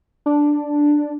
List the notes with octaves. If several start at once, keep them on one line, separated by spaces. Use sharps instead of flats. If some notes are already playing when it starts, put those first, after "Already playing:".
D4